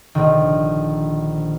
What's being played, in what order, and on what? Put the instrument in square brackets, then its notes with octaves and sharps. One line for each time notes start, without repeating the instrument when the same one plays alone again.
[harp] A#1 D3 D#3